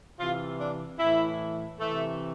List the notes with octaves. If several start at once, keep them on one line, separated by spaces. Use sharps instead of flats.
C3 E3 F4
D4
A2 E3 E4
C3 E3 A3